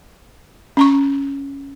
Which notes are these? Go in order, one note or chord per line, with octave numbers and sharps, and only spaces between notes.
C#4 A#5 C#6